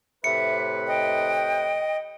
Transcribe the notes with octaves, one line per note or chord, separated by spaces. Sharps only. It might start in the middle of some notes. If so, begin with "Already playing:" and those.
A2 C3 B4 E5 C#7
D#5 G5